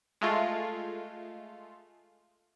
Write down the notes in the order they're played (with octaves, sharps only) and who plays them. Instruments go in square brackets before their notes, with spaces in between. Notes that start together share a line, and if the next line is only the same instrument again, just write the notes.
[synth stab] G#3 A3 F4